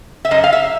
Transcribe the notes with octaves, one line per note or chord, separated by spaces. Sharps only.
E5
F#2 D#5
F5
E5